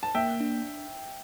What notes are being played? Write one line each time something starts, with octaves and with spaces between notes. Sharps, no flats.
A5
A#3 E5 G5
D4